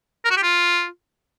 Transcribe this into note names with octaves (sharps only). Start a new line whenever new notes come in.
A#4
F#4
G4
F4